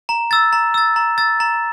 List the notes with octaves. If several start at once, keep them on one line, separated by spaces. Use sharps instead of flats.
A#5
E6 A6
A#5
E6 A6
A#5
E6 A6
A#5